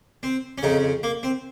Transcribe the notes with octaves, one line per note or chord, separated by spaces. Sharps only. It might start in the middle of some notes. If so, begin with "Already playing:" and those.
C4
C#4
F2 C#3 D#4
A#3
C4